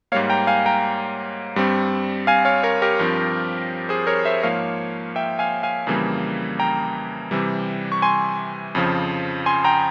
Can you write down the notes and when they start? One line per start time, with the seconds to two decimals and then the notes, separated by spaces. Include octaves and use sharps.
0.12 G#2 G3 A#3 C#5 F5
0.30 G5 A#5
0.47 F5 G#5
0.66 G5 A#5
1.56 G2 G3 C4
2.27 F5 G#5
2.45 C#5 F5
2.63 A#4 C#5
2.82 G4 A#4
2.99 G2 F3 C4
3.89 G#4 C5
4.07 A#4 C#5
4.25 C5 E5
4.43 G#2 F3 A#3 C#5 F5
5.16 E5 G5
5.39 F5 G#5
5.63 F5 G#5
5.87 F2 C#3 E3 G3 A#3
6.59 G5 A#5
7.31 C3 E3 G3
7.92 C#6
8.02 G#5 C6
8.75 F2 C#3 F3
9.46 G#5 C6
9.64 G5 A#5